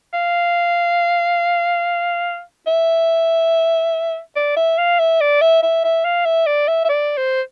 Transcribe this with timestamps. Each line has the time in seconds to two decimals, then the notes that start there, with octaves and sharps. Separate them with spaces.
0.13 F5
2.67 E5
4.36 D5
4.56 E5
4.78 F5
4.99 E5
5.21 D5
5.41 E5
5.63 E5
5.84 E5
6.05 F5
6.26 E5
6.46 D5
6.68 E5
6.85 E5
6.89 D5
7.17 C5